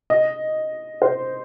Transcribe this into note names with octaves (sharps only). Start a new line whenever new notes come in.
D#5
C5